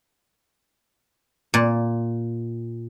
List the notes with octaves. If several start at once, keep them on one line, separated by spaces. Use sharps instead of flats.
A#2